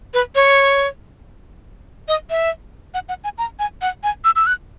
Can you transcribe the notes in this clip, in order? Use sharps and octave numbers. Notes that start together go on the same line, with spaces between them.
B4
C#5
D#5
E5
F#5
F#5
G#5
A#5
G#5
F#5
G#5
E6
E6
F#6